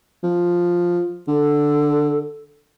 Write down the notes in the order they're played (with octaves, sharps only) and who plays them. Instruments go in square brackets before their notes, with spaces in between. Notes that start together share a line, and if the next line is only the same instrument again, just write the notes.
[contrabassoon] F3
[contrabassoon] D3 [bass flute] A4